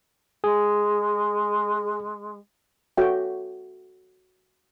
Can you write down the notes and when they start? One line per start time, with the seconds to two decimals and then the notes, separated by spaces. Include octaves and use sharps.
0.44 G#3 G#4
2.97 F#4 A4 C#5 E5 G5